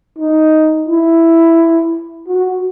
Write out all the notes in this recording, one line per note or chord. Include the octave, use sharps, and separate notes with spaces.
D#4
E4
F#4